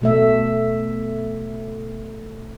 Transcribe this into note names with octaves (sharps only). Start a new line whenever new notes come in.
B2 A3 E5